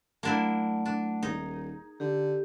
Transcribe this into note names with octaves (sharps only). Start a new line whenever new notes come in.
F#3 A3 A#3 D4 E4
D4
D#1 D#4 G#4
D3 G4